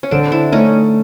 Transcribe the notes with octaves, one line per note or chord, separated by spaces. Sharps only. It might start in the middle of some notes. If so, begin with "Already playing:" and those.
C#4
D3 C4 D4
D4 E4
A3 C#4 D#4